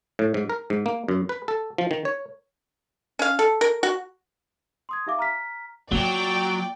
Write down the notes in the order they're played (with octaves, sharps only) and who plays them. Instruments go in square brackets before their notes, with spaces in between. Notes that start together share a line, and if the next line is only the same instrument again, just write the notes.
[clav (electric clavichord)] A2
G#2
A#4
G#2
A#3
F#2
B4
A4
F3
D#3
C#5
[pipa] C#4 F5
A4
A#4
F#4
[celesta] C6 D#6 G#6
D#4 G4 E5 F5 D6
A#5 F6 B6
[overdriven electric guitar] F#3 [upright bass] A#3 F4 [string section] D5 G5 D6